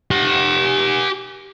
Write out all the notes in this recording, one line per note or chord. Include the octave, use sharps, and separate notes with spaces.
G4 F#5